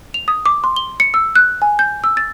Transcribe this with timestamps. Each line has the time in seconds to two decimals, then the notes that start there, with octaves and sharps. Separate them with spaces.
0.14 F7
0.28 D#6
0.46 D6
0.64 C6
0.76 G7
1.00 C#7
1.14 E6
1.35 F#6
1.62 G#5
1.79 G6
2.04 E6
2.17 A6